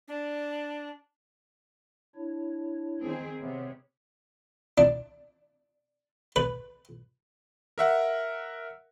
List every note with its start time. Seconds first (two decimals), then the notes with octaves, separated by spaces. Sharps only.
0.08 D4
2.15 D4 E4 C#5
3.03 D#3 C4 G#4
3.39 C3 B3 C#5
4.78 D4
6.36 B4
7.78 A#4 E5 F#5